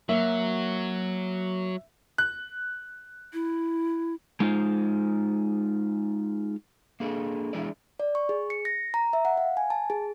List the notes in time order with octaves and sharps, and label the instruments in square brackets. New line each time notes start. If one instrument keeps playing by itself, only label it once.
[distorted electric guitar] F#3 [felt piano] A#3 [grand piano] E5
[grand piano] F#6
[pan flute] E4
[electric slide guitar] G#3 D#4 F4 C5
A#3 D4 G#4 A4
E3 G#3 D4 E4 G#4 D5
[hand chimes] D5
C#6
G#4
C#7
A#6
A#5
E5
F#5
F5
G#5
A5
G#4